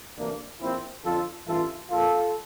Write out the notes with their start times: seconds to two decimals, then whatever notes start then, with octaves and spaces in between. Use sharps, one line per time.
0.16 D2 C3 E3 A#3 D4
0.60 A#1 A#2 F3 C4 E4
1.04 F2 D3 F3 F4 A4
1.47 A1 G2 E3 F4 A4
1.90 A#1 A#2 F3 F4 A4